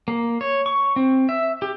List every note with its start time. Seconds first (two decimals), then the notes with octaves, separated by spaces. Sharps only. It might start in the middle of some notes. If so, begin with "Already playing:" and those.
0.08 A#3
0.41 C#5
0.66 C#6
0.96 C4
1.29 E5
1.62 G4